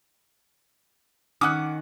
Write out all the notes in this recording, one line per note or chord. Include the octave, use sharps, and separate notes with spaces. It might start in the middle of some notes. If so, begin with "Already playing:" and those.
D#3 C#4 F#5 D6 D#6 F#6